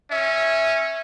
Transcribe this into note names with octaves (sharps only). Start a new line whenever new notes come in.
C#4 E5